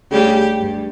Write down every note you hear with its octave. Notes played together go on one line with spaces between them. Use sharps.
D2 C#3 G3 G4
G2